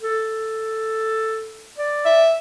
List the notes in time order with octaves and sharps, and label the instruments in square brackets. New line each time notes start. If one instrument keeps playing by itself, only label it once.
[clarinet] A4
D5
[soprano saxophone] E5